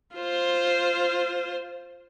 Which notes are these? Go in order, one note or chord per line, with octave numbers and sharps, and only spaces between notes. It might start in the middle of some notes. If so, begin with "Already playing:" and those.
F4 C5